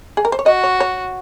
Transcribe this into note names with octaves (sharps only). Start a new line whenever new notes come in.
G#4
A#4
C5
C#5
F#4 D#5
C#5
C#5